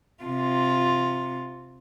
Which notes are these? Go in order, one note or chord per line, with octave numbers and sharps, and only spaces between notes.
C3 F4